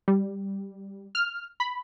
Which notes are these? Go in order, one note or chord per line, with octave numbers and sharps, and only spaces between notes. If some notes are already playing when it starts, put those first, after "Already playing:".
G3
F6
B5